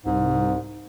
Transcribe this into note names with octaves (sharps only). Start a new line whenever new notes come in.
C2 G#2